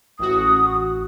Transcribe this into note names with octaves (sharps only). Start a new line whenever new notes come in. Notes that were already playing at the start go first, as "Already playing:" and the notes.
A1 F#4 D#6